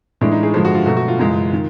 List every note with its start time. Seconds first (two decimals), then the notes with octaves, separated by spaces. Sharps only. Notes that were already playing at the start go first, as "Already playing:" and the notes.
0.21 A2 E3 G#3 D4
0.32 D#4
0.43 G#4
0.54 G2 D3 F3 G#3
0.65 F#4
0.75 F4
0.86 B2 F#3 A3 F#4
0.97 F#4
1.08 F4
1.19 F#2 C#3 E3 G#3
1.53 D#3